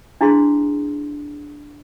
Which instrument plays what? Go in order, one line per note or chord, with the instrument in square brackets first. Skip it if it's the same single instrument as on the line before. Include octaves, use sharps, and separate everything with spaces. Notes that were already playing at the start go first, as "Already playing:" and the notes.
[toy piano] D4 E4 G#4 F5 C6